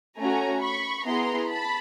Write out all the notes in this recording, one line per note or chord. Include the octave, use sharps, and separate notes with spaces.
A3 C#4 F#4 G#5 A#5
B5 C#6
B3 E4 G#4 A#5 C6
A5 B5